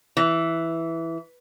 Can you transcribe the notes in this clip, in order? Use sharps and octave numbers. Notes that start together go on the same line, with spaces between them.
E3